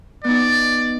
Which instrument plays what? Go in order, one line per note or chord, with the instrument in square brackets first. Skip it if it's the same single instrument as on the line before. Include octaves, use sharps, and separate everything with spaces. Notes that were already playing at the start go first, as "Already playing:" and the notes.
[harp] B3 D#4 [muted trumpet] D5